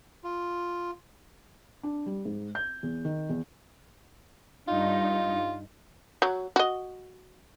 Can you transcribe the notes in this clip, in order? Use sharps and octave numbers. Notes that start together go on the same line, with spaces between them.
F4
D4
G3
G#2
G6
E2
D#3
E2
G2 D#4 F4
F#3
F#4 D#5